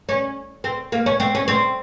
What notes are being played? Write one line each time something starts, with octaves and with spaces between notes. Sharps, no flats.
C#4
C4
A#3
C#4
C4
C#4
C4